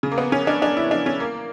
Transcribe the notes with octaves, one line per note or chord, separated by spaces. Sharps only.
C#3
A#3
B3
C#4
D4
D4
E4
D4
C#4
A#3